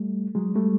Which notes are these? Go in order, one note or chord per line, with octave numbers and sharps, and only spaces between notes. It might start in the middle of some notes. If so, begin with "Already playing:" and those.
Already playing: G3 A3
F#3 G#3
G3 A3